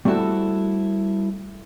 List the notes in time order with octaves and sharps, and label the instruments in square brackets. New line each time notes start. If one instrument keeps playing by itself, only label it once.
[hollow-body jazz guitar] G3 A3 C4 E4 F#4 A4